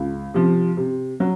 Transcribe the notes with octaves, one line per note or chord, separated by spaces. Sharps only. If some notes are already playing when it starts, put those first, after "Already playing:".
Already playing: C#2
C3 F3
C3
F#3